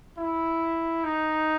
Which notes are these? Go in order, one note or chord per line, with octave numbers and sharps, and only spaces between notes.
E4
D#4